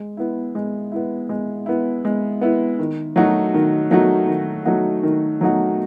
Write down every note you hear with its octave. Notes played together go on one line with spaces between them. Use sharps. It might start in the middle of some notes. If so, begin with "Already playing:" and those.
Already playing: G#3
B3 E4
G#3
B3 E4
G#3
B3 E4
G#3
B3 E4
D#3
F#3 A3 D#4 F#4
D#3
F#3 A3 D#4 F#4
D#3
F#3 A3 D#4 F#4
D#3
F#3 A3 D#4 F#4